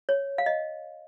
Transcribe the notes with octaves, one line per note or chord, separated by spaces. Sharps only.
C#5
F5
D#5